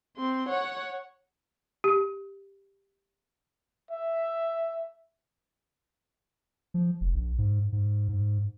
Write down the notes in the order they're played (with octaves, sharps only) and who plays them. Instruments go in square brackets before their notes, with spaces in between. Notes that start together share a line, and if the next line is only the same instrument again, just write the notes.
[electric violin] C4 C6
C#5 F#5
[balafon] G4
[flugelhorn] E5
[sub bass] F3
F1
A#1
G#2
G#2
G#2